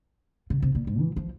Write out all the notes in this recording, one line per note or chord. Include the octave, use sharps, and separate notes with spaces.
C#3
C3
A#2
G#2
E3
F3